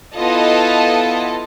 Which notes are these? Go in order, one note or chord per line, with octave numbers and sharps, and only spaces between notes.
B3 E4 F4 A4 D#5 A5